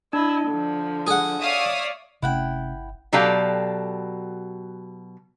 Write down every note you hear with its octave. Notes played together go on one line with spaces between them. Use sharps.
D4 E4 D#5
D3 F3
G#4 F#5
C#5 D5 E5 F5 D#6
G1 C3 A3 C#4 E4 F#5 G5
B2 F#3 G4 A4 D5 F5